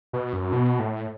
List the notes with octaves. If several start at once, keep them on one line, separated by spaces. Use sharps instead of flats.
B2
F#2
B2
A2